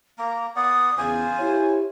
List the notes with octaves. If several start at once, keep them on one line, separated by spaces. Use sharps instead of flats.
A#3 A#5
B3 D5 F#5 D#6
E2 C#3 F4 C5 G#5
E4 G4 C#5